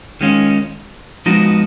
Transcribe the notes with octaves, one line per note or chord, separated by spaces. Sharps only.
D#3 G#3 C#4 F4
F3 G#3 B3 D#4 F#4